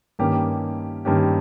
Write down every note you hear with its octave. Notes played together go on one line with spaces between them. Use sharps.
G2 D#3 A#3 C#4 G4
G2 D#3 A#3 C#4 G4